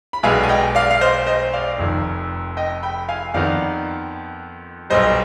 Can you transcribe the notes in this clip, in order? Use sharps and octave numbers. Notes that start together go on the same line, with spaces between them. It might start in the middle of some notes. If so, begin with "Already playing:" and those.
B5
B1 B2 G#3 D4 F5 G#5
G#5
D#5 G5
D5 F5
F5
C5 D#5
C5 D#5
D5 F5
F1 F2 D#3
D#5 G5
G5 B5
F5 G#5
F2 D#3 B3 D#4 D5 F5
B1 B2 G3 C5 D#5